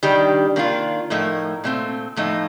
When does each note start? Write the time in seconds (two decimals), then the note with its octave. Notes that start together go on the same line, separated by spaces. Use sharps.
0.03 D#3 G3 D4 G4
0.56 D#3 A#3 D4 F4
1.10 A2 F3 A3 D#4 A#4
1.64 A#2 A3 C4
2.16 A2 F3 A3 D#4